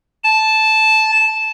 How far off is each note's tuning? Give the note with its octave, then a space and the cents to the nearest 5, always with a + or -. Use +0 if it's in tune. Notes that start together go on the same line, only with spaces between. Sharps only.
A5 -10